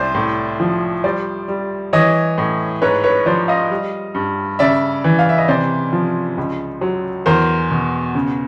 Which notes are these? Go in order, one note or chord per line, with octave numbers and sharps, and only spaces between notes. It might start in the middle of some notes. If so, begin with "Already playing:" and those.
Already playing: C2 C5 D5
A2
F3
G3 C5 D5
G3
E3 C#5 D#5
A2
G#2 B4 C#5
B4 C#5
F3 C5 D5
D#5 F5
G3
G2
C#3 D5 E5
E3
F5
E5
D#5
C3 C5 D5
F3
C#2
F#3
E2 A#4 C5
B2
C#3